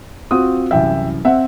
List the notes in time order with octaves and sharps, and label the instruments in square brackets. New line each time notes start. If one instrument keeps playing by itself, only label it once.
[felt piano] C4 F4 F#4 [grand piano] D#6
[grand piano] C2 F#2 E3 [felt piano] E5 G5
[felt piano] C4 [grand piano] E5 F#5